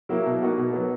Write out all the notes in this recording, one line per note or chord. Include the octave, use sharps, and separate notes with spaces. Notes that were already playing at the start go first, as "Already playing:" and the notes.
F#3 A#3 E4
B2
A#3 D#4 F#4
B2
F#3 B3